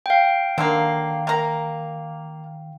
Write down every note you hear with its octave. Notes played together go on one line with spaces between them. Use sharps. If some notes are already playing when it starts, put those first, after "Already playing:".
F5 G5
D3 D#3 F#3 A#3
A#3 A#5